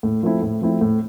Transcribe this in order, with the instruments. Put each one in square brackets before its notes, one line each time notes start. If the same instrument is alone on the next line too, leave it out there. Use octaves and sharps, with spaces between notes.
[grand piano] A2
F3 A3 C4 E4
A2
F3 A3 C4 E4
A2